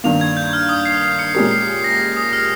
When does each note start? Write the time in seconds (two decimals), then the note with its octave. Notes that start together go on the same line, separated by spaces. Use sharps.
0.04 G2 D#3 A#3 F7
0.21 G#6
0.37 G6
0.53 F6
0.69 D#6
0.85 C7
1.02 C7
1.19 C#7
1.34 A#2 G#3 C#4 G4 A#4 C7
1.51 C7
1.84 A#6
2.17 D#6
2.33 F6